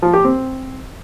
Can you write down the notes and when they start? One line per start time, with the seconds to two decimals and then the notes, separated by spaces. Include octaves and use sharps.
0.02 F3
0.13 G4
0.25 C4